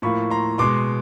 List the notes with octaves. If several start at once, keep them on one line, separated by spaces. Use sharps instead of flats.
A2 F3 A#3 B5 C#6
A#5 C6
B2 G#3 C6 D6